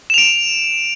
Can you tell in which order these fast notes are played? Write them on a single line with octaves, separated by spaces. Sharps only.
E7 F7 D7